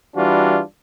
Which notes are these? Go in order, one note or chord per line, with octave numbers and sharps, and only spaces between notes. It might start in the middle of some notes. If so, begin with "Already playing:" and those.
E3 G3 D4 F4 F#4